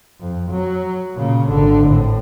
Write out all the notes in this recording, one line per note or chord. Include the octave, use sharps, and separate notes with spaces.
F2
F#3
A#2 C#3
G#1 D3
A2